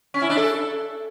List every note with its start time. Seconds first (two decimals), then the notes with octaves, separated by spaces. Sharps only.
0.14 C#4
0.22 E4
0.29 D4
0.37 A4